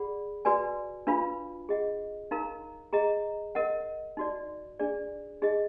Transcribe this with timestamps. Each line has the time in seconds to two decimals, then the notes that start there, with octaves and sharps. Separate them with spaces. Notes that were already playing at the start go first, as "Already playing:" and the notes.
Already playing: G#4 D5 F#5 B5
0.45 F#4 B4 D5 G#5
1.07 D4 F4 B4 F5 B5
1.69 G#4 D#5 F#5
2.31 D#4 A#4 F5 A#5
2.93 G#4 D#5 A#5
3.55 A#4 D#5 F#5
4.17 D#4 F#4 D5
4.79 D4 G#4 D5
5.42 D#4 G#4 D#5